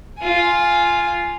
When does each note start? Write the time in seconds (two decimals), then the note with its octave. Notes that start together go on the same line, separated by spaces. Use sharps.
0.19 F4 G#5